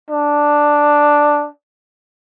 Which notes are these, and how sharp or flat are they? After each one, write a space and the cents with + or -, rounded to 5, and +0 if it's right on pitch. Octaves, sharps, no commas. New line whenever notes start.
D4 +0